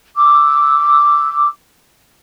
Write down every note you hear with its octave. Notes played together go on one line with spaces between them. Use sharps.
D6 E6